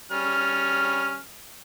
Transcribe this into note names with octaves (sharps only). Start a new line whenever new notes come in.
G3 C#4 F6